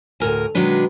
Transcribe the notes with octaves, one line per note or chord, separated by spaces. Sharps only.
D2 A2 A#4 G#5
B2 D#3 F#3 G#3 D4 B4